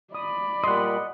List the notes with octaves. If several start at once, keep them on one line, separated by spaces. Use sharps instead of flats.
D5 B5 D#6
A#2 G3 D#5 F#5 C6